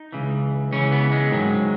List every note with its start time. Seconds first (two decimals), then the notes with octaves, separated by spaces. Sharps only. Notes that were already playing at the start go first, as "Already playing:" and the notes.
Already playing: D#4
0.12 C#2 C#3 E3
0.71 C#2 C#3 E3 C#4
0.92 B3
1.12 G#3
1.32 G#2 D#3 F#3